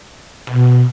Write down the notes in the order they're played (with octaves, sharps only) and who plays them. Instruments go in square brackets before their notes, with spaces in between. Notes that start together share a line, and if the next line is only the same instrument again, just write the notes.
[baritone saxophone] B2